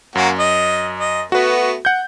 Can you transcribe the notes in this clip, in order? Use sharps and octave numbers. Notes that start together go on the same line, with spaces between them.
F#2 A#3 C#4 F#4
D#5
D#5
A3 B3 F#4 B4
F#5 G6